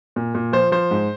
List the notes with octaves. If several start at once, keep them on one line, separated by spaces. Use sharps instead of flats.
A#2
A#2
F3 C5
F3 C5
G#2